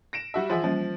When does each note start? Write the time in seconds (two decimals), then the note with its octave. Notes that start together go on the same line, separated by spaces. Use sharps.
0.13 A#6 D7 E7
0.34 G3 F#4 E5
0.49 E3 F3 G#4 E5 F#5 C6
0.64 F3 G3 A#3 C#4